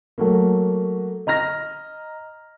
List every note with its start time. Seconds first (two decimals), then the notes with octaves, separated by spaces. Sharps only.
0.18 F#3 A3 A#3
1.27 D#5 A#5 F6 A#6